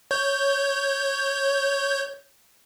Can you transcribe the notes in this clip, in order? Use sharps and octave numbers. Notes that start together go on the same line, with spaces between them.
C#5 G6